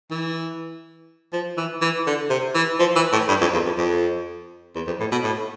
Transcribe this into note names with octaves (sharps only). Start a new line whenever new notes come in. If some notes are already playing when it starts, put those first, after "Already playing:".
E3
F3
E3
E3
D3
C3
E3
F3
E3
A2
G2
F2
E2
F2
F2
E2
F2
A2
B2
A2